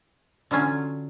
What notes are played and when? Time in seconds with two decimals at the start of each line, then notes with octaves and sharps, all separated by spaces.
0.51 D3 F#3 C#4 F4